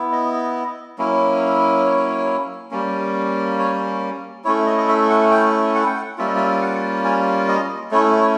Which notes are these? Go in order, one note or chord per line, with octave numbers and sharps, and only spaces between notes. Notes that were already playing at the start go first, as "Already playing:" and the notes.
Already playing: B3 E4
D#5
F#3 A#3 C#4 E4
C#5
G3 A#3 C#4
C#5
A3 C#4 E4 C#5
D#5
D#5
E5
F#5
G5
F#5
G5
F#5
G3 A#3 C#4 F4 E5
D#5
E5
F#5
G#5
D#5
A3 C#4 E4 C#5
C#5